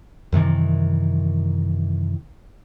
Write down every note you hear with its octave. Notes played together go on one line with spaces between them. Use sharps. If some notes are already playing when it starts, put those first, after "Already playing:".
F#2 C3 D#3 E3